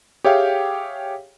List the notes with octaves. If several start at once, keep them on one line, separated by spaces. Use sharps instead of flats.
G4 G#4 C#5 E5 F5 G5